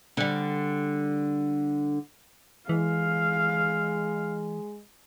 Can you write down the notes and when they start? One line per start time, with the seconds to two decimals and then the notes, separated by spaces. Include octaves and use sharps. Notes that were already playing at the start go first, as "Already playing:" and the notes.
0.17 D3 G3
2.69 E3 G#3 F5